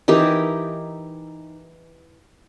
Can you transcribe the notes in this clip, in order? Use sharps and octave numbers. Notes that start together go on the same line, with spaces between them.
E3 D#4 G4 A#4